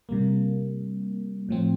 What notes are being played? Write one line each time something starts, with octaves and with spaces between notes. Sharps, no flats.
C3 G3 A#3
A2 F3 C4